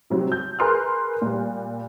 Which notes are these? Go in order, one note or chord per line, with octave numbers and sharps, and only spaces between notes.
C3 F#3 G3 C4
G6
G#4 A#4 B4 C6 F6 F#6
A#2 G3